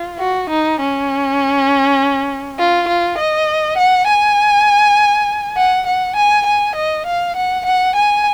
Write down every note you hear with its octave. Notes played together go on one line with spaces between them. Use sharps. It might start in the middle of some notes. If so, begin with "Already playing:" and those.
Already playing: F4
F#4
D#4
C#4
F4
F4
D#5
F#5
G#5
F#5
F#5
G#5
G#5
D#5
F5
F#5
F#5
G#5